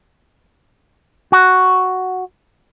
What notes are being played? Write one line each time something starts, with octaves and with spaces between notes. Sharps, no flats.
F#4